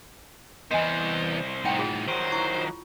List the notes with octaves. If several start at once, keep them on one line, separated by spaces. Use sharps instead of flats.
C2 E3 B3 C5 D#5 G#5
A2 D#4 F#5 G5
F4 G#4
D#3 F#3 C5
E4 C#6
F4